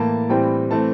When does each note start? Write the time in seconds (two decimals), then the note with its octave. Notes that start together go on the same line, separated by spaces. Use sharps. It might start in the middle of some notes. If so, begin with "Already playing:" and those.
Already playing: A2 E3 A#3 A5
0.29 A2 E3 G3 C4 G5
0.70 E3 A3 C4 A5